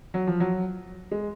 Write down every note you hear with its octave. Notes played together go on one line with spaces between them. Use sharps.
F#3
F3
F#3
G#3